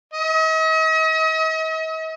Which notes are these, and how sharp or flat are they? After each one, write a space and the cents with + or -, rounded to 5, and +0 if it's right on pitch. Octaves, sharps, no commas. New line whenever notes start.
D#5 +45